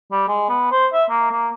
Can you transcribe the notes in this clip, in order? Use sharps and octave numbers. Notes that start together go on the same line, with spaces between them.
G3
G#3
B3
C5
E5
A#3
A#3